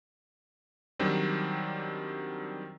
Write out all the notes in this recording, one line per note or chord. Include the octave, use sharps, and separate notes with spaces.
D#3 F#3 G3 C4 D4